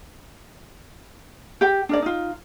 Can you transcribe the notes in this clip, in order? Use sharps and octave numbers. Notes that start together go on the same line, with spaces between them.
G4 G5
D4 A#4 D5
D#4 F4